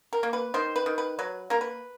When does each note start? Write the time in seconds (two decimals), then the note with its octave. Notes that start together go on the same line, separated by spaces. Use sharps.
0.13 A#4
0.23 A#3
0.33 B4
0.54 D#3 C5
0.76 B4
0.86 D#3
0.98 B4
1.19 F#3 B4
1.50 A#3 A#4
1.61 B4